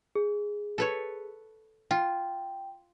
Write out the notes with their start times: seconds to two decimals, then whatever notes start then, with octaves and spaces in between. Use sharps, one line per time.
0.15 G#4
0.78 A4 B4 C#5
1.91 F4 G5